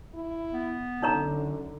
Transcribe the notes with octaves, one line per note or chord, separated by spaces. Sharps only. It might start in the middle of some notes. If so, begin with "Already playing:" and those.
E4
B3
F#2 D3 D#4 C#5 A#5